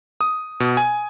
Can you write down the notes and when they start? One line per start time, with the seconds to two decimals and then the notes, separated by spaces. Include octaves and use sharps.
0.21 D#6
0.60 B2
0.77 G#5